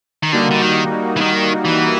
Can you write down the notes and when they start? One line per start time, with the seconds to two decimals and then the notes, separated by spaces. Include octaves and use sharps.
0.23 D#3
0.32 D3 G3 A#3 D#4 F#4
0.51 D3
0.62 D#3
1.16 E3
1.21 D#3
1.65 E3